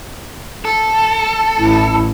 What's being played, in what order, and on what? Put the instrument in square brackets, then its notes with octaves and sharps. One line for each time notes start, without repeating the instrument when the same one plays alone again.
[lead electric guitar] A4
[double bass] A1 [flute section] E4